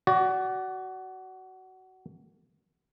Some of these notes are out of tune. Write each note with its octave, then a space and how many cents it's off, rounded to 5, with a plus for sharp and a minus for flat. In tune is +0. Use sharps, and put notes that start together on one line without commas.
F#4 +20 D5 -15